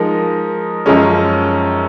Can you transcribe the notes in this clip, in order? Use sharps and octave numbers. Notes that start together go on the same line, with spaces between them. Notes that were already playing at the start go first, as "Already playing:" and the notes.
Already playing: F3 G#3 D#4 A#4
F#2 F3 G#3 C#4